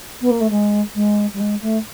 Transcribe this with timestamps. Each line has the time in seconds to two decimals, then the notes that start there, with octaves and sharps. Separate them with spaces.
0.21 B3
0.30 A#3
0.40 A3
0.49 G#3
0.94 G#3
1.33 G3
1.39 G#3
1.62 A3